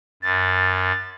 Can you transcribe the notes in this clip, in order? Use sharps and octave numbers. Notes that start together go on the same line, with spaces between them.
F#2 A6